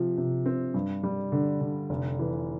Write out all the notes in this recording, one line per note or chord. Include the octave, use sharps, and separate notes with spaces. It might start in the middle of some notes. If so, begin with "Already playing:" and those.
Already playing: C3 F3
C3
C4
G2
G3
D3
D3
F1
E3